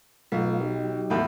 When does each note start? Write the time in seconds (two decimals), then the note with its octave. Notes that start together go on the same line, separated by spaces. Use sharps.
0.32 B1 A3 B3 F4
0.61 F#3 D#4 G4
1.10 E2 A2